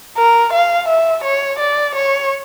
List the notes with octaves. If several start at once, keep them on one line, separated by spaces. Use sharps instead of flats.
A#4
F5
E5
C#5
D5
C#5